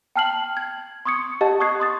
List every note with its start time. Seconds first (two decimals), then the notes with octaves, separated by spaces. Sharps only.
0.16 G5 A5 F6 C7 F#7
0.57 G#6
1.05 C6 C#6 D#6 G#6 C#7
1.41 G4 D#5 F#5 A5
1.60 C#6 D#6 F#6 G#6 C7
1.80 C6 D#6 A6